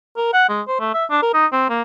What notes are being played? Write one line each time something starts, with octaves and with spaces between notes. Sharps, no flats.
A#4
F#5
G#3
C5
A3
E5
D4
A#4
D#4
C4
A#3